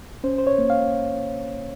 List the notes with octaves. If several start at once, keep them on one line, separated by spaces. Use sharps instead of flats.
C#4 C5
C5
C#5
A#3
F5